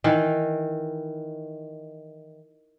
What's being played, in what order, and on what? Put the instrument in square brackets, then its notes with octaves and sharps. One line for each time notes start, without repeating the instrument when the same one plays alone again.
[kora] D#3 E3